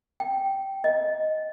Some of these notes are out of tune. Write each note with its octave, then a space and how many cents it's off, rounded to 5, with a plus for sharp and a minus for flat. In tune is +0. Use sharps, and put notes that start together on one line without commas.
G5 -10
D#5 +5